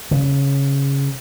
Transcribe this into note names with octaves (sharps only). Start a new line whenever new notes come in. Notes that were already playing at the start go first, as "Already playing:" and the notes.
C#3